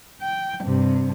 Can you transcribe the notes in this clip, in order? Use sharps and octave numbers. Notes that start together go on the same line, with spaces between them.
G5
G2 C3